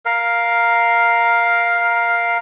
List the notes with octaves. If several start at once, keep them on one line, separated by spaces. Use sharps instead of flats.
A#4 F5